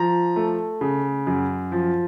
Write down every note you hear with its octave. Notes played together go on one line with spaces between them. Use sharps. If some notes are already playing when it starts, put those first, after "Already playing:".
Already playing: F3 A#5
A3
C#3
F#2
F3